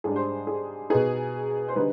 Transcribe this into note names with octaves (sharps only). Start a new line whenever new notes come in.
G#2 G3 D4 G#4
C5
G#4
B2 B3 D#4 G#4
C5
D3 G3 B3 D#4 B4